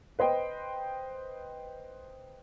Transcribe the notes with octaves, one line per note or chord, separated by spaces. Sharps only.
B4 C5 D#5 G5